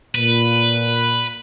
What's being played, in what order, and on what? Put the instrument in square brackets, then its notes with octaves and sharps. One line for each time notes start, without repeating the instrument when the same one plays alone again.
[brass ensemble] A#2 [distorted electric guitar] B4